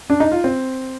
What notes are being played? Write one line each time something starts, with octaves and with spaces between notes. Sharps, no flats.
D4
D#4
F4
C4